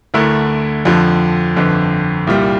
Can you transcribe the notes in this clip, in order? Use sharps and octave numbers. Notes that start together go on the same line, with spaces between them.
D2 D3 A3 E4 A#4
F2 D3 F3
G1 F2 D3
C2 A#2 G3